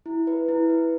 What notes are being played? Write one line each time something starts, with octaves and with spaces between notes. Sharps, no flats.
E4
B4
E4
B4